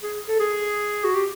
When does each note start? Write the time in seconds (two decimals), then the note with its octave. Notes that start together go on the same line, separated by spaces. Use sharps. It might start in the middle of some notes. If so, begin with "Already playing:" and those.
0.02 G#4
0.28 A4
0.40 G#4
1.04 F#4
1.14 G4